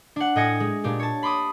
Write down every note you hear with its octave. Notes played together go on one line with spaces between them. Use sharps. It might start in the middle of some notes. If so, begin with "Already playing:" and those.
D4 F#5
A2 D#5 G5 G#5 A#6 C#7
G#3
A#2 D4 G4
C#5 A5
B5 C6 D6 D#6